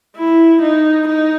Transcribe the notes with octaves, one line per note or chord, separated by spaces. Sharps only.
E4
D#4
D#4